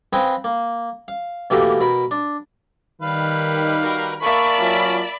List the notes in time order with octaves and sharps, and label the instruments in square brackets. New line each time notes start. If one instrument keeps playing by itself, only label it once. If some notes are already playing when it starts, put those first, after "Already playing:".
[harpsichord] C4 B4 D#5 F5 G5 G#5
A#3
F5
B2 E3 A3 A#3 G4 A#4
B2 A#4 B5
D4
[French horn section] D#3 [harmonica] G3 B4 F5
[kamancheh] F#4 [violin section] A#4
[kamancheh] A#3 A5 [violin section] D5 E5 B5 [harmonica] C#6
[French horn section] F#3 F4 F#4 [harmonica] C#4